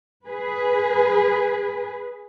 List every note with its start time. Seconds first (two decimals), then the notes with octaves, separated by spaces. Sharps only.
0.27 G#4 B4